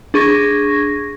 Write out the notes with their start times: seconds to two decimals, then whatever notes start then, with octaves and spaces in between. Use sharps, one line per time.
0.14 D4 G#4 C#6 G#6 A#6